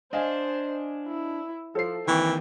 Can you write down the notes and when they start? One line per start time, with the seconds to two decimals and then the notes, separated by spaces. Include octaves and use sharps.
0.13 D4 C5 D#5 F5 G#5
1.07 E4
1.75 F3 A4 C5 C7
2.08 D#3 E3 A#3 C4 G5 C#6